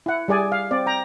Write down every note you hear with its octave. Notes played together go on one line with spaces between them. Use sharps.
E4 F#5
G3 G#4 D5 G#5
F5
C4 D5
G5 A#5